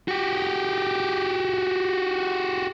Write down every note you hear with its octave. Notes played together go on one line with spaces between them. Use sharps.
F#4 G4